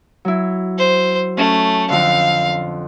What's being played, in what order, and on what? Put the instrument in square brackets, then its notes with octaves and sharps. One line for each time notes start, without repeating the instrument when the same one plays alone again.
[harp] F#3 E4
[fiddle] C5
[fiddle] A3 [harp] C#4
[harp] F2 D3 [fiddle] F5